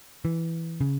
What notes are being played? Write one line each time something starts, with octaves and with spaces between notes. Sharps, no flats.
E3
C#3